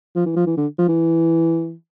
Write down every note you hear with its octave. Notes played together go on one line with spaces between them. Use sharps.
F3
E3
F3
E3
D3
F3
E3